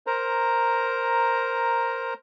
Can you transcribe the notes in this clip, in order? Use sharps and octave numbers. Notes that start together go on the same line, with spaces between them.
A#4 C5 A#5